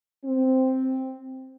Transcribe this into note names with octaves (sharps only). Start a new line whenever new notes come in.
C4